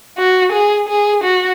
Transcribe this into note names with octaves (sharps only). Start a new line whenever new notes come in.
F#4
G#4
G#4
F#4